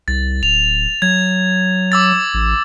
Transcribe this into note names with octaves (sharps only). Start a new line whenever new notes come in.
C2 A6
D1 F7
F#3 G#6
D6 E6 A6
A1